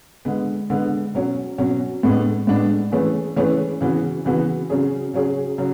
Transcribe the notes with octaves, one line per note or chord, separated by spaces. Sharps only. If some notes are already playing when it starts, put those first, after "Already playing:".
D3 G#3 B3
D3 G#3 B3
B2 F#3 C#4
B2 F#3 C#4
A2 G#3 B3 D4
A2 G#3 B3 D4
E3 A3 C#4 G#4 B4
E3 A3 C#4 G#4 B4
C#3 E3 B3 F#4
C#3 E3 B3 F#4
C#3 F#3 C#4 G#4
C#3 F#3 C#4 G#4
C#3 F#3